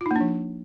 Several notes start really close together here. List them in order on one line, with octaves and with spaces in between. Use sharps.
F4 D#4 A#3 D4 F3